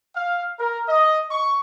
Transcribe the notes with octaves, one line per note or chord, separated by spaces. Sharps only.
F5
A#4
D#5
C#6